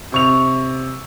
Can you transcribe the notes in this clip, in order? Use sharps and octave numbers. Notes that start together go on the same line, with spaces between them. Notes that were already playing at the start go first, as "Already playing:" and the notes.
C3 C#6 F7